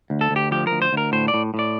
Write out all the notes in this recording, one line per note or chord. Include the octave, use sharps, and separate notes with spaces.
D2
A4
D2
G4
F3 G4
D2 A#4
C5
D2 A#4
A2 C5
D5
A2
A2
D5